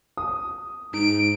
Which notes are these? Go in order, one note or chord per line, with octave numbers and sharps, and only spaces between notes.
D#6
G#2 D#4 D7